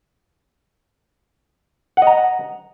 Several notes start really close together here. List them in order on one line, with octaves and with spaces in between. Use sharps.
F#5 D#5 A#5